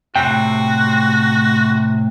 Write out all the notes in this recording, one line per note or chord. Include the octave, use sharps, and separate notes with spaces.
A2 C3 F#4 G5